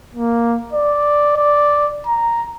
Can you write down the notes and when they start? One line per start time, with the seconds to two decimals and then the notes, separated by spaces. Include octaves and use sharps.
0.15 A#3
0.73 D5
1.37 D5
2.06 A#5